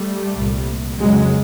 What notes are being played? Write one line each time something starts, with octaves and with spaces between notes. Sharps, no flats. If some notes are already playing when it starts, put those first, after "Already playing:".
Already playing: G3 A3
C2 A#2
F2 C#3 F#3 G#3